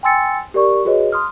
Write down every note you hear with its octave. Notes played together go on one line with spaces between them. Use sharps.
G5 G#5 C6 E6 A6 C#7
G4 A#4 D5 C#6
F#4 G#4 B4 C#5 D#5
C6 D#6 F6